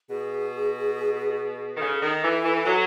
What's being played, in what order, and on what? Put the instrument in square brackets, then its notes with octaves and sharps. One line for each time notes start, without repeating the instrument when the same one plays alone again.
[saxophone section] B2 [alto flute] G#4
[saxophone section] D#3
[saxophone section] C#3 [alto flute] A4
[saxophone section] D#3
E3
E3
E3
F#3